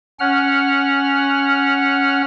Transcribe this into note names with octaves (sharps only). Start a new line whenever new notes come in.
C#4 F#5 F6